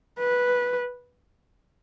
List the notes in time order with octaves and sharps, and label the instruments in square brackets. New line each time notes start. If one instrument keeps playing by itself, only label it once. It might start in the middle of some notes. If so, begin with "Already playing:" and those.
[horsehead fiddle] B4